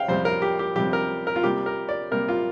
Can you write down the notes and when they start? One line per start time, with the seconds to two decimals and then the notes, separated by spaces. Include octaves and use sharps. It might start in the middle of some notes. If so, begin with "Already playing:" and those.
Already playing: F5 G5
0.09 F2 C3 G3 C5
0.25 A#4
0.42 G4
0.59 G4
0.76 F2 C3 G3 G4
0.93 A#4
1.27 A#4
1.36 F4
1.43 C3 G3 A#3 G4
1.66 A#4
1.89 D5
2.11 C3 G3 A#3 A#4
2.28 F4